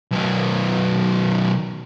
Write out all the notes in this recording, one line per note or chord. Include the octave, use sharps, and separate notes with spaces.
B1 D#3